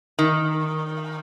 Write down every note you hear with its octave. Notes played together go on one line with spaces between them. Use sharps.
D#3